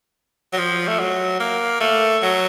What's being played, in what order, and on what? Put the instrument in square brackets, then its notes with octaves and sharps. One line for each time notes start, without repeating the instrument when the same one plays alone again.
[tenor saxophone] F#3
F3
A3
F#3
A#3
A3
F#3